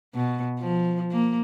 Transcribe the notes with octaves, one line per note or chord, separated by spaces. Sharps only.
B2
F3
A#3